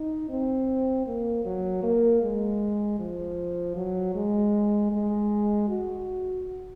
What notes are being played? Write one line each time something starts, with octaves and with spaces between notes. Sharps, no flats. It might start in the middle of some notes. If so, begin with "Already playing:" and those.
Already playing: D#4
C4
A#3
F#3
A#3
G#3
F3
F#3
G#3
G#3
F#4